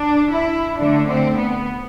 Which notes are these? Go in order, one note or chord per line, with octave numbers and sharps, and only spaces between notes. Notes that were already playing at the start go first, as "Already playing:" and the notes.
Already playing: D4
E4
D3 A3 D4
C4
B3